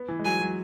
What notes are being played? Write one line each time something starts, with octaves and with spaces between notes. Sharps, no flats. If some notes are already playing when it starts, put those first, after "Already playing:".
Already playing: B3
E3
G#3
F#3 G#5
F#3